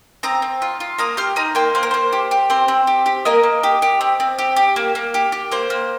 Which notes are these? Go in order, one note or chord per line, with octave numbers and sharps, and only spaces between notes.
C4 A#5 D#6
C4
F4
F4
A#3 A#5 D#6
G4 C6 F6
D#4 A#5 D#6
A#3 G5 C6
A#3 C5
A#4
A#3 C5
G4
G4
C4 C5
C4
G4
G4
A#3 A#4 D#5
A#3
G4
G4
C4
C4
G4
G4
A#3
A#3
G4
G4
A#3 C5
A#3